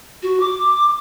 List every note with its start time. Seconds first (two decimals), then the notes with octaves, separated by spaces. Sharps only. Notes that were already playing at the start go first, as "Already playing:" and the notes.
0.23 F#4
0.40 D6